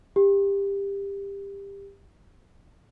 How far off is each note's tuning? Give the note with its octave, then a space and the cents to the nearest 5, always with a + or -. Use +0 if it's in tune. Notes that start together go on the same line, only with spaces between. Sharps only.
G4 +20